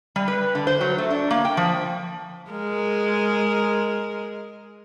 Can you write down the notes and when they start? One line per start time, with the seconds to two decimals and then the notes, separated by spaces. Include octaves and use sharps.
0.16 G3
0.28 B4
0.55 D3
0.67 C5
0.81 F#3
0.98 A3
1.10 D4
1.31 A#3
1.45 G5
1.57 F3
2.51 G#3 A#4